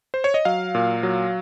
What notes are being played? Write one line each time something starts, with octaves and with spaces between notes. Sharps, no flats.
C5
C#5
D#5
F#3 F5
A#2
F#3